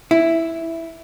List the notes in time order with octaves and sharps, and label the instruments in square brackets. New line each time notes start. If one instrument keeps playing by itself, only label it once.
[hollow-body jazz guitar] E4